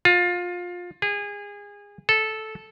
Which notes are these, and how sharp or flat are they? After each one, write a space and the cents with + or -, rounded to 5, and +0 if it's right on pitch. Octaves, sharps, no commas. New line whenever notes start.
F4 +20
G#4 -25
A4 -10